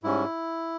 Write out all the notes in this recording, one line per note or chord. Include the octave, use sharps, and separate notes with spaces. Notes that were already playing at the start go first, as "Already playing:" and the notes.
G#2 G3 C#4 E4